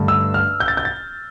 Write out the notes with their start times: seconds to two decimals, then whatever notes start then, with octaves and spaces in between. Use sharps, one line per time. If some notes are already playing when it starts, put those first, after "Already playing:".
Already playing: G2 D3 A3
0.08 E6
0.34 F6
0.60 G6
0.68 A6
0.77 G6
0.85 A6